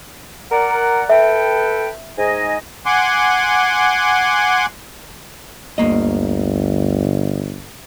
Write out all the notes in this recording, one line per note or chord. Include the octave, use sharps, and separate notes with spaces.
A#4 D5 F#5
A4 B4 E5 G5
G#2 D#5 G#5
F#5 G#5 C6 D6
G1 D2 A#3 D#5